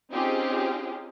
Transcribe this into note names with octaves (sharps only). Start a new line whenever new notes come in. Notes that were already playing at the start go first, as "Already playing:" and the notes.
C4 C#4 D#4 F4 G4 G#4